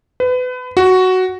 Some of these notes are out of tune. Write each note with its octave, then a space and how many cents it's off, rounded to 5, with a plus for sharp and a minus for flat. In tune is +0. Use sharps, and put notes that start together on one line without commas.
B4 +30
F#4 +5